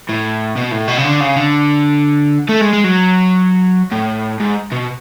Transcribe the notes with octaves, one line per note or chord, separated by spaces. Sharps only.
A2
B2
A2
B2
C#3
D3
C#3
D3
A3
G#3
G#3
F#3
A2
G#2
B2